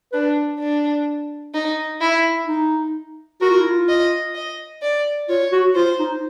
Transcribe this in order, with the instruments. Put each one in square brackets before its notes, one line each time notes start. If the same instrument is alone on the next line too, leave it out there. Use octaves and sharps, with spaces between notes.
[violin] D4 [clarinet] B4
[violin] D4
D#4
E4
[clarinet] D#4
[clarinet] F#4 [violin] A#4
[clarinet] F4
E4
F4
[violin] D#5
D#5
D5
[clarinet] F4 [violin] C#5
[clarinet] F#4
[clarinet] F4 [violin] C5
[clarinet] D#4